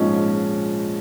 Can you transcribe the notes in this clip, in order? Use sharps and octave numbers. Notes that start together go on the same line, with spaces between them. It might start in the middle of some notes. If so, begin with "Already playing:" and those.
Already playing: A#1 G#2 F3 G#3 C#4